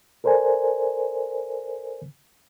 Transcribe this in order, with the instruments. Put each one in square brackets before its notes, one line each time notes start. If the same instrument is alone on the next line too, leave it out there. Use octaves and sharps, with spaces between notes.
[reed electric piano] A4 A#4 C5 D5 G#5